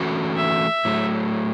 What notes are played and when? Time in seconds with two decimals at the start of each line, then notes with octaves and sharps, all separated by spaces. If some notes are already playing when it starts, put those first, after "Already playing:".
Already playing: E3 A3 C#4 F#4
0.37 E5
0.85 A2 F#3 A3